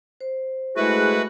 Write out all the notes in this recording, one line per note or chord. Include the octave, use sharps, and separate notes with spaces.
C5
G#3 A3 E4 F#4 G#4 B4